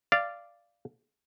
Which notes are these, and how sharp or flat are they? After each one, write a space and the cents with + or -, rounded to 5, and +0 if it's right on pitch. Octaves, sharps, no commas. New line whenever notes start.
D5 +0 F5 -15